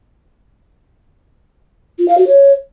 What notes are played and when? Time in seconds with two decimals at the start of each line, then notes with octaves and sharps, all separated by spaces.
1.99 F4
2.08 F5
2.18 F#4
2.27 C#5